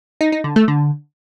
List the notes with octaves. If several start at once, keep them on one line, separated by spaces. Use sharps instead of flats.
D#4
D#4
D3
A3
D3